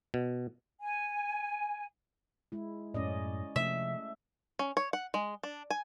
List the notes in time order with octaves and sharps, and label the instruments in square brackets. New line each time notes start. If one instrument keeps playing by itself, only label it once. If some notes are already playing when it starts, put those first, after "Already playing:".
[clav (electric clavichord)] B2
[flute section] G#5
[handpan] G#3 E4
[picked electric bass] F#2 A2 [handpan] C#4 D5 D#5
[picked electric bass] C3 F3 C#4 [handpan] A3 [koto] E5
[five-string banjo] C#4
C#5
F#5
G#3
D4
G#5